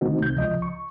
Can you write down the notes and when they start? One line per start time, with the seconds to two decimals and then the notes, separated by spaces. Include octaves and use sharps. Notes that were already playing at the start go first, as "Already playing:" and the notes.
0.01 D3 D#3 A3 C4 D#4 F#4
0.21 C2 G6
0.37 C#2 F3 D#5
0.62 C#6